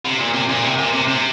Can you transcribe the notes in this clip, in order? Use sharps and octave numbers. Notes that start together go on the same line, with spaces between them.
C3
A#2
C3
A#2
C3
A#2
C3
C3